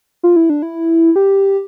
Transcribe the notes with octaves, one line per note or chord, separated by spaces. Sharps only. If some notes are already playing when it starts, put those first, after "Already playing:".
F4
E4
D4
E4
G4